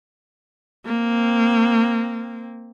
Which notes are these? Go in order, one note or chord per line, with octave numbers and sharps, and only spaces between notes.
A#3 C4